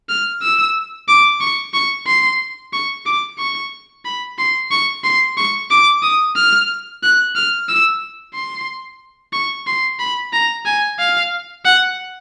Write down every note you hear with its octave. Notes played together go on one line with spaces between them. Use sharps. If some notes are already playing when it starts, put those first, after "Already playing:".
F6
E6
D6
C#6
C#6
C6
C#6
D6
C#6
B5
C6
C#6
C6
C#6
D6
D#6
F6
F#6
F6
E6
C6
C#6
C6
B5
A#5
G#5
F5
F#5